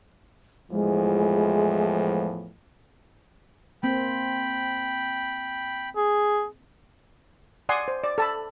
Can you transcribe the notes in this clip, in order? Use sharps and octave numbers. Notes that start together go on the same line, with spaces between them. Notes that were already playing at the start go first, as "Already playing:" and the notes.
E2 A2 F3 G#3
A#3 C4 G5 B5
G#4
D5 F#5 G#5 C6 D#6
C5
D5
A4 A5 B5